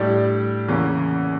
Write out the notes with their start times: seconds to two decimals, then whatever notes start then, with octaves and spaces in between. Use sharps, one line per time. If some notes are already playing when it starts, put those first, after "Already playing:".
Already playing: A2 G3 D4 G4 D5
0.68 E2 C#3 E3 A#3 C#4